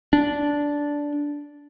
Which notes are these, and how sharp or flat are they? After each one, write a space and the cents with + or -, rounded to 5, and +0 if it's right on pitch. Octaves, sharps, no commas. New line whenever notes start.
D4 -10